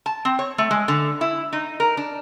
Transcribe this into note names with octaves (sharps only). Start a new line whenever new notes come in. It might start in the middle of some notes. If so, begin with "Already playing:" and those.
A5
C4
C#5
A3
G#3
D3
E4
D#4
A#4
D4